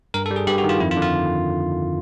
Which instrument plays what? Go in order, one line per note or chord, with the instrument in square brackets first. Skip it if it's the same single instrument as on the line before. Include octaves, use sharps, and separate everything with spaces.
[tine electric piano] G2 A#4
A4
G3
G#4
G2 G4
F#4
D#3
F4
F2 E4
F4
D3
F4